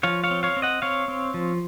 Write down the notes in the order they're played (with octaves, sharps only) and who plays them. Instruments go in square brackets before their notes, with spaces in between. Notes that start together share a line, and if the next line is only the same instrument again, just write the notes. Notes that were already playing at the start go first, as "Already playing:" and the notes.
[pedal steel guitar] F3 C#5 F5
C#5 F5
C4
C#5 F5
C4
D#5 F#5
C4 C#5 F5
C4
F3